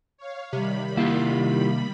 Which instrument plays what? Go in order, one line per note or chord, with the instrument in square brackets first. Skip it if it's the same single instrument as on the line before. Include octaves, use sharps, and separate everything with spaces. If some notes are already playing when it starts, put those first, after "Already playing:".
[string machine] C#5 F5
[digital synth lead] C3 [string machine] D#3 G3 B5
[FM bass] A#3 [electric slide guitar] E4 F4 G4